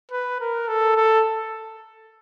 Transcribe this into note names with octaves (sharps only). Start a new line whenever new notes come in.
B4
A#4
A4
A4